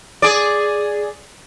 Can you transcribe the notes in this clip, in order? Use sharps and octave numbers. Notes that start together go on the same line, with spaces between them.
G#4 D5